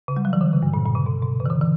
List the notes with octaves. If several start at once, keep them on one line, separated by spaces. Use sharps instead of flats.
C#3
G3
F#3
E3
D3
C#3
G2
A#2
A#2
C#3
B2
B2
C#3
E3
D3
E3